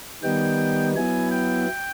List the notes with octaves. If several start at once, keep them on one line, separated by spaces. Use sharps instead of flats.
D#3 G3 B3 D#4 G5
F#3 B3 E4 G#5
G5